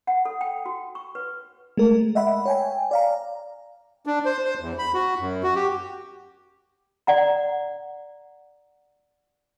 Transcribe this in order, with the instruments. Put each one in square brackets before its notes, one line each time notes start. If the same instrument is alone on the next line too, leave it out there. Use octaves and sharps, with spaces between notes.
[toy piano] F#5
A4
G5
F#4
C#6
B4
[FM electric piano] G#3 A3 A#4
D#5 E5 F#5 B5
C#5 G5 G#5
D5 F5 A#5
[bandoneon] D4
C5
C5
E2
B5
F#4
F#2
F#4
G4
[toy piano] D5 F#5 A#5